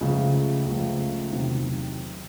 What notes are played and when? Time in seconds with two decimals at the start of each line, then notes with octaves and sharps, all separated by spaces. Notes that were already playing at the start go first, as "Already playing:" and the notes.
0.01 C#2 C#3 F3 A3
0.66 C#2 C#3 F3 A3
1.31 E2 C3 D#3 F#3